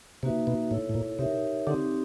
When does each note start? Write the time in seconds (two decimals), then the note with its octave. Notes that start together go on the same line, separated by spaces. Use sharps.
0.23 C3 A#3 D#4 F#4 B4 E5
0.47 B2
0.71 A2 E4 A4 C#5
0.89 A2
0.94 A#2
1.19 C3 D#4 G4 A#4 C#5 E5
1.67 D3 C4 D#4 G4